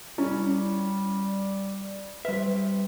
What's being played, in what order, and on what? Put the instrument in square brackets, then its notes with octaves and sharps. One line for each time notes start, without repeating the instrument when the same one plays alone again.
[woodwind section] G3 [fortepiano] C#4 [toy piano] E4
[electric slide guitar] G3 E5 [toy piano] B4 C5